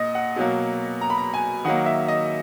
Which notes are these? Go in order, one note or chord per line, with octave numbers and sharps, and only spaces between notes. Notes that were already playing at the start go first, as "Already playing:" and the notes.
Already playing: A#2 D#5
F#5
B2 F#3 A#3
A#5
B5
A#5
G#5
D#3 F#3 A#3 F#5
E5
D#5